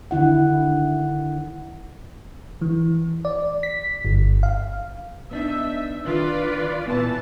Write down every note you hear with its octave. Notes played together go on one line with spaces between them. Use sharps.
D3 D#3 E4 F#5
E3
D5
B6
G1
F5
B3 D4 D#4 E5
D#3 D4 F4 B4 D5
A#2 E3 B3 A5